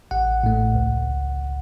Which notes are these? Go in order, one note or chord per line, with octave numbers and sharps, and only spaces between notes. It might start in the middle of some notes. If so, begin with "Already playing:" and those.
A1 F#5
A2 A3
C#2